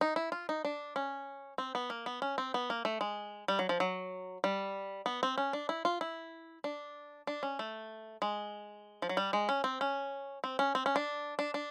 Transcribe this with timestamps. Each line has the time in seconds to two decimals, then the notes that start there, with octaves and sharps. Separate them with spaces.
0.01 D#4
0.16 E4
0.32 F4
0.49 D#4
0.65 D4
0.96 C#4
1.58 C4
1.75 B3
1.90 A#3
2.06 B3
2.22 C#4
2.38 C4
2.54 B3
2.70 A#3
2.85 A3
3.01 G#3
3.48 G3
3.59 F#3
3.69 F3
3.80 F#3
4.44 G3
5.06 B3
5.23 C4
5.38 C#4
5.53 D4
5.69 E4
5.85 F4
6.01 E4
6.64 D4
7.27 D4
7.43 C#4
7.59 A3
8.22 G#3
9.02 F3
9.09 F#3
9.17 G3
9.33 G#3
9.49 C#4
9.64 C4
9.81 C#4
10.44 C4
10.59 C#4
10.75 C4
10.86 C#4
10.96 D4
11.39 D4
11.54 D4